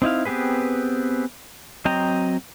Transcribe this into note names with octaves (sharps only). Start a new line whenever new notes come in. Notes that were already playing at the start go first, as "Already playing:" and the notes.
C4 D#4 E4 F5
B3 C4 G4 G#4 B4
F#3 C4 D#5 G5 A#5